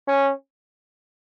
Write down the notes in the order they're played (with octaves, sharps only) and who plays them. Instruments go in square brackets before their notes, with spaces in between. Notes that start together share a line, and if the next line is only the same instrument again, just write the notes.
[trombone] C#4